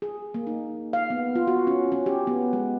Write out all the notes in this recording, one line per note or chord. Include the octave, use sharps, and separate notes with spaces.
G#4
A#3
D#4
F5
B3
F4
F#4
C#4
C#4
G4
B3
G#3